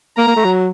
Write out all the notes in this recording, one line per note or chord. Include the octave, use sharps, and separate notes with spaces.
A#3 A#5
A#3
A3
F#3